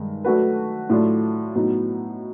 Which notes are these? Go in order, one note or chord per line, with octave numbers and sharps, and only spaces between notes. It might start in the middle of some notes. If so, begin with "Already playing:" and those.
Already playing: G2 D#3 G#3
F#3 A3 D4 F#4 B4
A2 F#3 A3 D4 F4
A2 F#3 B3 D#4